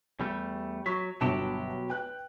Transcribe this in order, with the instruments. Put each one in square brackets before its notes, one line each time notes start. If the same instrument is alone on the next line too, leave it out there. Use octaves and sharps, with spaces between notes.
[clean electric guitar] E2 G3 A3
[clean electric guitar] F#3 [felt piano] C#6 B6
[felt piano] G1 A5 E7 [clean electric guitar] B2 F#3 G4
[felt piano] B4 G5 F#6